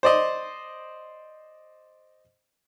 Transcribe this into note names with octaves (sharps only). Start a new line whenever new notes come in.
C5 D5 D#5